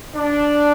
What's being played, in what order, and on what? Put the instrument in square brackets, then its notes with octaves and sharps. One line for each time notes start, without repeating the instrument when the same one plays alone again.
[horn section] D4